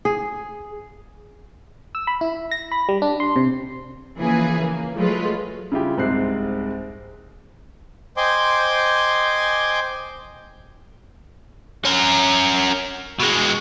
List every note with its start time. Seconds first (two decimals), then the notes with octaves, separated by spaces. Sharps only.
0.05 G#4
1.95 E6
2.07 B5
2.21 E4
2.51 A#6
2.72 B5
2.89 G3
3.02 D4
3.20 C6
3.36 C3
4.19 C#3 E3 F3 A#3 G#4 B4
4.59 A#3
4.96 F3 F#3 G#3 A3 F4 B4
5.72 C#3 G3 E4 F4 G4
5.97 C2 G#2 C4 F#6 C7
8.17 C5 D#5 G5 G#5 C6 D6
11.85 C#4 A#4
13.20 B2 G#3